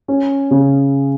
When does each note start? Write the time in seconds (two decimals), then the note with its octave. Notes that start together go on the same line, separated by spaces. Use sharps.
0.08 C#4
0.51 C#3